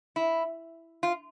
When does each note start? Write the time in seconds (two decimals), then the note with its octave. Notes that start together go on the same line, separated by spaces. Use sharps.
0.16 E4
1.03 F4